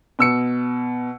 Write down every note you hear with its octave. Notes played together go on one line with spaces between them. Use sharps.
B2 E6 C#7